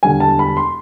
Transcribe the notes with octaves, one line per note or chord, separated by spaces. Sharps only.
E1 D2 D3 G3 G#5
A5
B5
C6